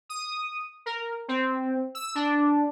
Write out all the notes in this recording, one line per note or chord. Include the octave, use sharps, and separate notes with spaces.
D#6
A#4
C4
E6
D4